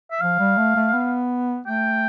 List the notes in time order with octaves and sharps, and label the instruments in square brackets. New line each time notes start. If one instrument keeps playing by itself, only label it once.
[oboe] E5
[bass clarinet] F3 [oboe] F5
[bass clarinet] G3
A3
A3
B3
[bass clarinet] A3 [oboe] G5